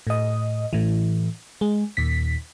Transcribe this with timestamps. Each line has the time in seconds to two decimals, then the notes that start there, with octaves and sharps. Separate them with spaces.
0.07 A2 D#5
0.73 A2 E3
1.61 G#3
1.97 D#2 A#2 B6